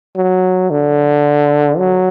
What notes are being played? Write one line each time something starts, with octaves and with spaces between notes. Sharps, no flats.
F#3
D3
F#3